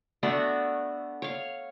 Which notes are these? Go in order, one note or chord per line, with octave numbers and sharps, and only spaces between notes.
A3 B3 D4 F#4
C#5 F5